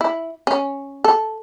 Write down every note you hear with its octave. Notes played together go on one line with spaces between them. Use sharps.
E4
C#4
A4